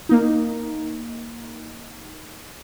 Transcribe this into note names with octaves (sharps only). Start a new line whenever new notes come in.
A#3 D#4